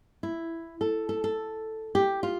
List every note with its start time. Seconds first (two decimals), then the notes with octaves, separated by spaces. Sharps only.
0.23 E4
0.81 A4
1.09 A4
1.24 A4
1.95 G4
2.23 F4